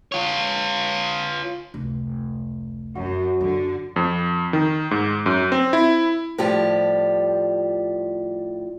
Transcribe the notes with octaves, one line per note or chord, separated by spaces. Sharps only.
F4 C#5
F1 C#2
F#2 F#4
F#2 D3
F2
D#3
G#2
F#2
C4
E4
A2 F3 G3 G4